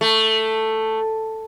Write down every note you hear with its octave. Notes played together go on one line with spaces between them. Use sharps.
A3